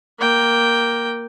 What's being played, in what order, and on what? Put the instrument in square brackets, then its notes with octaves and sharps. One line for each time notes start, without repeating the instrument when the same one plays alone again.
[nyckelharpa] A#3 G5